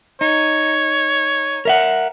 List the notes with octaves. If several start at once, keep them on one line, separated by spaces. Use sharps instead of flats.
D#4 C#5
A#4 E5 F#5